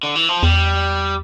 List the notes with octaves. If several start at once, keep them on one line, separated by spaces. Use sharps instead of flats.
D3
E3
F3
E2 G3